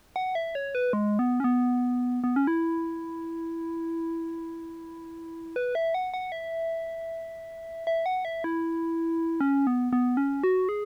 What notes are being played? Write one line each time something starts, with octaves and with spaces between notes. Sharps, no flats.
F#5
E5
C#5
B4
G#3
B3
C#4
B3
B3
C#4
E4
B4
E5
F#5
F#5
E5
E5
F#5
E5
E4
C#4
B3
B3
C#4
F#4
G#4